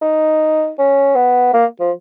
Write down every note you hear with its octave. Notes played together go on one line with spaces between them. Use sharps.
D#4
C#4
B3
A#3
F3